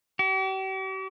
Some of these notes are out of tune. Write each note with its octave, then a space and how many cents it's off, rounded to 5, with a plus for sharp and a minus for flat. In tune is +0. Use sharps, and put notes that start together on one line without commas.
G4 -45